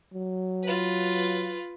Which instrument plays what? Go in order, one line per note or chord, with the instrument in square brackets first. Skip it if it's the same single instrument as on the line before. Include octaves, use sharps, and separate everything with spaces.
[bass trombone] F#3
[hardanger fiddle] F4 B4